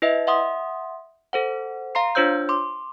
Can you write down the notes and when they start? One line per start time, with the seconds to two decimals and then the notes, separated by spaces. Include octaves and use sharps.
0.02 E4 B4 D#5 E5
0.27 E5 F#5 C6 D#6
1.33 A4 C5 F#5
1.95 F5 A#5 C6 C7
2.15 D4 F4 C5 C#5 E6 G6
2.49 C6 D6